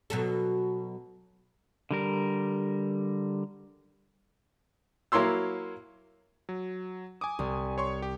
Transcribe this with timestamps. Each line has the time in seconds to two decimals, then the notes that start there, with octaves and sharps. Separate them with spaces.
0.10 B2 F#3 A4
1.91 D3 G3 A#4
5.12 F#3 A#3 E4 C#5 C6 E6
6.49 F#3
7.21 G#5 D6 D#6
7.39 C2
7.78 C#5 C6 C#6
8.02 G4